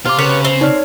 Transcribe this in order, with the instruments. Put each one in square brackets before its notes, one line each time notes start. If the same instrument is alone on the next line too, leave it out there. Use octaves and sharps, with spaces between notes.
[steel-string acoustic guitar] C3 [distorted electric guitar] F4 [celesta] D6 F6
[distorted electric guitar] C#3 [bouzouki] B3 B4 C#5
[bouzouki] C4 [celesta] G7
[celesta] D#4 D5 F6 [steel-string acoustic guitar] C#5